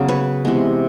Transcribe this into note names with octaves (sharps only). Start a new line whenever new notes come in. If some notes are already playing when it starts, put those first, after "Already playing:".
Already playing: C#3 F#3 B3
B4 C#5
C3 E3 G#3 B3